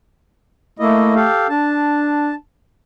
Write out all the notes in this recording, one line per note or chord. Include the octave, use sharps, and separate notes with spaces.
A3 A#3 E4 D#5
G4 A4 F5
D4 A5